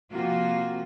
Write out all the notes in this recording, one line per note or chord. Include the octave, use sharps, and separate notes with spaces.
C3 F3 A#3 F4 F#4